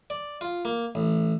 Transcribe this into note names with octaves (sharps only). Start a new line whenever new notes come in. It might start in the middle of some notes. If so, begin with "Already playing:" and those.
D5
F4
A#3
A1